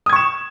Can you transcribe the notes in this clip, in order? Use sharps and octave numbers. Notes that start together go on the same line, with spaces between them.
C#6 D#6 G#6 E7